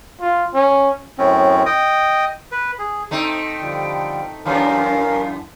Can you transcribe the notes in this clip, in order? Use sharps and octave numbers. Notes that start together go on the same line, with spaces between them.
F4
C#4
F#2 A2 C4 C#4
D#5 G5 D#6
B4
G#4
A3 C4 D#4 G5
D3 F3 G3
F#2 E3 C#4 A#4 F5